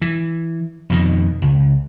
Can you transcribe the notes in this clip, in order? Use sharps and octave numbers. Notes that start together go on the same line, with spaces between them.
E3
F2 B2 D#3
C#2